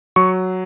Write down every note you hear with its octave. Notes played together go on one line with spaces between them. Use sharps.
F#3 C#6